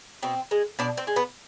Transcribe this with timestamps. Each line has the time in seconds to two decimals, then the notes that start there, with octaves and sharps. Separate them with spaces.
0.23 B2 C4
0.51 G#3
0.79 B2 D4
0.97 C4
1.07 G#3
1.16 B3